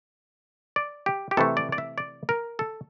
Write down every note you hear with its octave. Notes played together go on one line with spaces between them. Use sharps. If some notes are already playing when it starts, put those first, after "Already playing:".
D5
G4
G4
C3 E3 A3 A4
D5
D5
E5
D5
A#4
A4